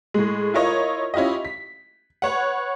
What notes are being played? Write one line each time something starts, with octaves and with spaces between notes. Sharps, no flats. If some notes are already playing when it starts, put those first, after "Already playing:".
A2 G#3
E4 F4 A#4 C#5 D#5
C#4 E4 F4 G4 D#5
B6
B4 C#5 F#5